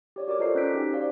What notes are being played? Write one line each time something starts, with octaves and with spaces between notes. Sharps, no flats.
G4 C#5 D5
F#4 A#4 D5 D6
F4 A4 C5 D#5 A#5 C7
C#4 E6 F#6 G6 B6 D7
D#4 G4 G5
F#4 G4 C5 D5 F5